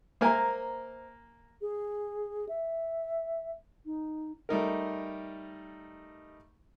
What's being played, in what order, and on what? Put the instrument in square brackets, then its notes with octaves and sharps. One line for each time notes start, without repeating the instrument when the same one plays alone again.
[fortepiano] A#3 A#4 G#5 [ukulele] C5 E5 A#5
[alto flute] G#4
E5
D#4
[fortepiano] G3 A3 D#4 A#4